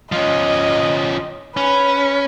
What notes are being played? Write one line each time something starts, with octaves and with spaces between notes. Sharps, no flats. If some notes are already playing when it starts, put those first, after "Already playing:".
F3 C#4 D#5
C#4 B4